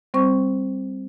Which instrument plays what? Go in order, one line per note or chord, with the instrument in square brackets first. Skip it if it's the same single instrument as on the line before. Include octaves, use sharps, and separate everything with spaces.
[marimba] G3 C4 C5 C#6